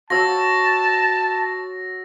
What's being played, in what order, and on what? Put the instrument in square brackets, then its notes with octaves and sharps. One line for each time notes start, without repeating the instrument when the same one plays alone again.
[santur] F#4 C#5 [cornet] A5 [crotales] E6 A#6